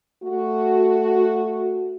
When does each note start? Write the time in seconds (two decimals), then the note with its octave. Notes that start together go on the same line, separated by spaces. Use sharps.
0.24 A3 F#4